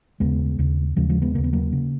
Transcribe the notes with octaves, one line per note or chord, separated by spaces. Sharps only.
D#2 C#3 G#3 B3
D#2 C#3
D#2 C#3 F3 G#3
F3 G#3
G#3 B3
D#2 C#3 A#3
B3
F#3 A#3
C#3